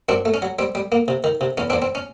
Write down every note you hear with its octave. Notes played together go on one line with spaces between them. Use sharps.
F#2 C4 D4
A3
C#4
F#3
G3 C4
G3
A#3
C3
D#3
C3
E2 C#4
E2 C4 D4
C4
C#4